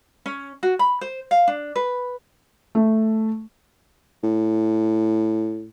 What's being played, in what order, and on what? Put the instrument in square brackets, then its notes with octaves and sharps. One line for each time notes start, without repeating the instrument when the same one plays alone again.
[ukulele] C#4
F#4
B5
C5
F5
D4
B4
[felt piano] A3
[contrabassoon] A2